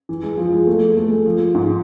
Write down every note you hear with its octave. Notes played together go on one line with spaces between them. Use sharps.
E3
G#3
F3
G#3
A3
A3
G#3
F3
G#2